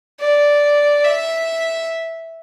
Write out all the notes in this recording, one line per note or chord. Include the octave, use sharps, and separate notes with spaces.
D5
E5